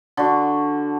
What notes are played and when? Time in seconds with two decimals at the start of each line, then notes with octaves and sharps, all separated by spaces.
0.17 D3 F#4